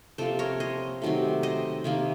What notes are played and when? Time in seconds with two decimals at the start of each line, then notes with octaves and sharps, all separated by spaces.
0.18 C3 F3 A#3 A4 C5
0.39 A#4 C#5
0.60 C5 D#5
1.02 C3 D#3 F#3 A3
1.43 C5 D#5
1.84 C3 D#3 A#3